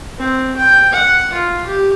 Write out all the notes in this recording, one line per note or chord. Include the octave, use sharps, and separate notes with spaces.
C4
G5
F#5
F4
G4